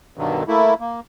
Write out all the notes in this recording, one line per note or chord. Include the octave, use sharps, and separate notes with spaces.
G2 B2 D3 D#3 F#3
A3 A#3 E4
A#3